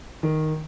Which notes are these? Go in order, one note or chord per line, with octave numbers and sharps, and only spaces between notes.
D#3